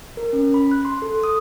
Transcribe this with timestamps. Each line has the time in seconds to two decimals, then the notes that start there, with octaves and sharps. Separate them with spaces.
0.17 A#4
0.33 C#4
0.54 B5
0.71 F#6
0.85 C6
1.02 A4
1.24 D#6